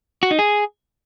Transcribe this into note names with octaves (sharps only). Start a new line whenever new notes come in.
F#4
D#4
G#4